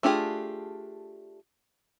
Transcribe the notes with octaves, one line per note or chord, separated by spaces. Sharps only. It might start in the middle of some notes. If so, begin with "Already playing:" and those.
A3 D4 F4 G4 G#4